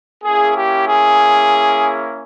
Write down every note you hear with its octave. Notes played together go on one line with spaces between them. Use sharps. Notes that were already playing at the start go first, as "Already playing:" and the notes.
A#3 C#4 E4 G#4
G4
G#4